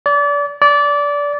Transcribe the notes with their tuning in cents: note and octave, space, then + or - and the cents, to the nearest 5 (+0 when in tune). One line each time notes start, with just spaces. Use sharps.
D5 -30
D5 -20